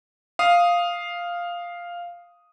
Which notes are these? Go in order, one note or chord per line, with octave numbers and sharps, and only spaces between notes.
F5 D#6